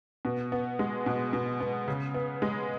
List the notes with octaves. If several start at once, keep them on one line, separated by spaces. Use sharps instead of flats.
B2
B3
G#3
B2
B2
B3
C#3
B3
G#3